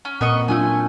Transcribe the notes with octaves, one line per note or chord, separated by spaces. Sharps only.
C#4
A#2 B3 C4 A#4 D#5 C#6
F#3 A3 C#4 D4 F4 G#5